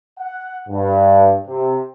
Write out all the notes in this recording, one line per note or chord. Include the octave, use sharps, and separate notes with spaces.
F#5
G2
C3